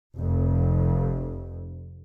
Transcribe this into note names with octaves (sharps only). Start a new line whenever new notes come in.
F1 F2